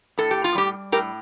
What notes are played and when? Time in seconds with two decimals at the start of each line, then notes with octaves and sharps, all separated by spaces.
0.18 A2 A4
0.31 G4
0.44 F4
0.55 G3 G4
0.92 A2 G4 A#4